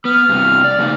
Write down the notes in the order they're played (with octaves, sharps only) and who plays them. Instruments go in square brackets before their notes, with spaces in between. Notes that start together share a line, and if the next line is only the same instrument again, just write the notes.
[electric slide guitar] B3 [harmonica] F6
[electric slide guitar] G2 C3
D5
C#3 A#3 D#4